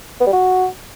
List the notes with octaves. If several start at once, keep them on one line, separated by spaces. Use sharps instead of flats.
B3
G3
F#4